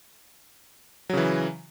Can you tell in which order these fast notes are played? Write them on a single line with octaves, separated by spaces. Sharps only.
F#3 C#3 E3